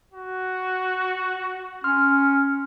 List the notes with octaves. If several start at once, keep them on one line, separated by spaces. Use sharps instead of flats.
F#4
C#4 C6 F6